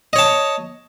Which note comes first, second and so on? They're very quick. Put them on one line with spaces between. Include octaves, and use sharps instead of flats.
D#5 C#5 A5